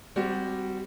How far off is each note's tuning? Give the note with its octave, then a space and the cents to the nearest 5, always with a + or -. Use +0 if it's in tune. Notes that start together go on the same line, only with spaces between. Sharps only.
G3 +0 C4 -15 F#4 +15